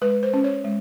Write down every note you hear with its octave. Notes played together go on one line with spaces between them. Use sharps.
G#3 B4
C5
C#4
C#5
G#3